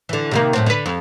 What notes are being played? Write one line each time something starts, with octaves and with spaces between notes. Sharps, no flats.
D3 E3
C3 D#3 A#3
F#2 A2 C4
D3 B4
F2